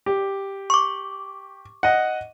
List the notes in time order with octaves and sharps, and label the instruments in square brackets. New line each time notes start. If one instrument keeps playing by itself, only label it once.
[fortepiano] G4
[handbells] C#6 D6
[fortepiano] D#5 F#5